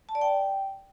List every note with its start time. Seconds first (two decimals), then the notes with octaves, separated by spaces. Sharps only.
0.09 A5
0.15 D5
0.21 G5